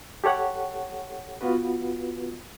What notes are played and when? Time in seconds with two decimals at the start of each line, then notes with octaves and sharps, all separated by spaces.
0.24 G4 A4 C#5 F#5
1.41 B3 F4 F#4 B4